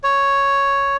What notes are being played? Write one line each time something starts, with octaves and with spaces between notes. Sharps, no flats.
C#5